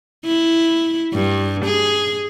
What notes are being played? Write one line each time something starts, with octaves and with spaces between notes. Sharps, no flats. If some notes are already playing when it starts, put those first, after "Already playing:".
E4
G2
G#4